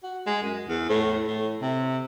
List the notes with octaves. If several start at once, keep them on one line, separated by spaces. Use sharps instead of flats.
F#4
G#3
F#2
E2
A2
A2
C3